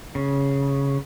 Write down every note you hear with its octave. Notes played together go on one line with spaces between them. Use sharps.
C#3